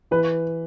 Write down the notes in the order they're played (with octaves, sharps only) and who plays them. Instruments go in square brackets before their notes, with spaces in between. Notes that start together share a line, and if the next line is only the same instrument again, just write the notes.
[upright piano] E3 B4